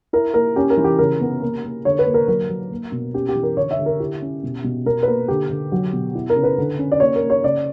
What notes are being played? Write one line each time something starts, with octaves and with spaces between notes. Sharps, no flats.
E4 A#4
A#3 A#4
C#4 G4
A#4
E3
G4
C#3 A#4
B3
A#3
A#3
D3 C#5
B4
A#3
A#4
F#3 A#4
F#3
A#3
B2
C#4 G4
G4
E3
A#4
D3 C#5
E5
D3
A#4
E4 G4
C#4
B2
B2
B2 A#4
B4
A#3 A#4
D3 G4
D3
F#3
B2
E4
A#4
C#3
B4
D3
C#4
D5
A#3 C#5
A#4
A#3
C#5
C#3 D5